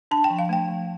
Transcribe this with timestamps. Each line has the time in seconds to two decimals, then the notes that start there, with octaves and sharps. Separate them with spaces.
0.11 D4 A5
0.24 G5
0.30 F3
0.39 F5
0.49 A3 G5
0.68 F3